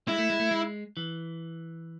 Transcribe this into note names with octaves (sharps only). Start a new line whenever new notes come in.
G#3 E4
A3
G#3
A3
G#3
E3